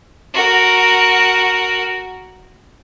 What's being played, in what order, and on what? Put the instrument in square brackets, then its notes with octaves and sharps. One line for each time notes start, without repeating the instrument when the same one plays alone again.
[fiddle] F#4 A#4